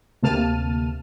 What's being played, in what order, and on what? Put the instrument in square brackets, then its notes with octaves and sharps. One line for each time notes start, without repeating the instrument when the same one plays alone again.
[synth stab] D2 C3 A#3 A5 F6 D#7